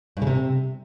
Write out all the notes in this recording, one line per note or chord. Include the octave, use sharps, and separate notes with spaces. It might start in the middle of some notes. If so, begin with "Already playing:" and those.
G2
C#3
C3